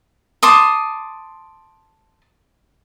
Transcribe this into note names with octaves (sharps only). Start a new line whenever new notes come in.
A5 C6 D6 D#6